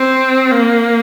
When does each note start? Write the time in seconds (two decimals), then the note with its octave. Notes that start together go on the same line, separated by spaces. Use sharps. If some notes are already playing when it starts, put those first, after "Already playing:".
Already playing: C4
0.51 A#3